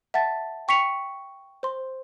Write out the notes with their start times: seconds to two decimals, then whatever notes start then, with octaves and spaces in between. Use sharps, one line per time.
0.14 E5 F#5 A5 A6
0.68 G5 C#6 B6 C#7 F7
1.63 C5 C6